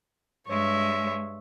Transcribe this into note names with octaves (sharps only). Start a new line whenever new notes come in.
G2 G#3 C#5 E5